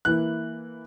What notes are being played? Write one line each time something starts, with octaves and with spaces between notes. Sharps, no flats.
E3 A#3 E4 F#6